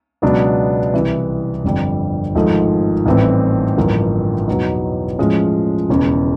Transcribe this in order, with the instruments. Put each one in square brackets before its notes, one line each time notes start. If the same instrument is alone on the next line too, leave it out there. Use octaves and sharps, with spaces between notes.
[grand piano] C#2 B2 F#3 B3 D4
C2 C3 E3
G1 F2 D3 G3 C4
G#1 G#2 F3 A3
A1 A2 E3 G3 C4
A1 G2 D3 F3 A#3
E2 B2 F#3 B3 D#4
A2 F3 G#3 C#4
E1 E2 C#3